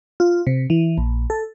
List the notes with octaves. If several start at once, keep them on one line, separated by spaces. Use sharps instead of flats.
F4
C3
E3
A#1
A4